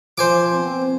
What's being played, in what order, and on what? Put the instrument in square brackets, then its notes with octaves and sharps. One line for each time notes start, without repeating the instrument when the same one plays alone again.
[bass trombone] F3 [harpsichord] C5 G#5 D6
[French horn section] B3 C4